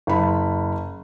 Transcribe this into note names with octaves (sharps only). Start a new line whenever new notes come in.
F#1 B5